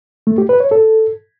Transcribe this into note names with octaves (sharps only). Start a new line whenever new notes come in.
A3
G4
B4
C#5
A4